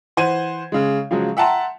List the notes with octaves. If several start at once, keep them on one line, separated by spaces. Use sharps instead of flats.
E3 C5 F#5 G#6 D#7
C#3 G#3
C#3 F3 F#3 G#3
E5 F#5 G5 A5 A#5 C6